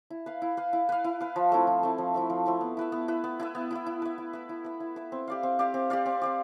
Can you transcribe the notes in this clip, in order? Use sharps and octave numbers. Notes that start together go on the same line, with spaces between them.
E4
B4 F5
E4
B4 F5
E4
B4 F5
E4
B4 F5
F3
A3 C4 E4
F3
A3 C4 E4
F3
A3 C4 E4
F3
A3 C4 E4
B3
E4 B4 E5
B3
E4 B4 E5
B3
E4 B4 E5
B3
E4 B4 E5
E4
B4 E5
E4
B4 E5
E4
B4 E5
E4
B4 E5
C4
G4 D5 F5
C4
G4 D5 F5
C4
G4 D5 F5
C4
G4 D5 F5